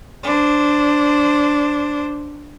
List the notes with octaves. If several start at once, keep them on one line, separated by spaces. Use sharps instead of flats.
D4 C5